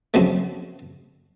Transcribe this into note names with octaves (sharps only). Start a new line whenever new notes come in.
F2 C#3 F#3 A3